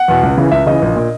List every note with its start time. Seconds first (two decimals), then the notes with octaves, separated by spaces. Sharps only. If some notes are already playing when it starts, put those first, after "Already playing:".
Already playing: F#5
0.08 E2 B2
0.23 C#2
0.37 C#3 E3
0.51 C#2 E5
0.66 C#3 E3 D#5
0.82 A#1
0.96 A#2